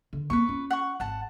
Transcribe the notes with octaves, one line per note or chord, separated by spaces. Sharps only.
D3
A#3 C4 B4 C#6
C#4 F4
F#5 C#6
G#1 F#5 A5